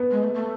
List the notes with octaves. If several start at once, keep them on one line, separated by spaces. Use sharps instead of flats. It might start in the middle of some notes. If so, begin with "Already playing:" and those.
Already playing: B3
G#3
A3
A3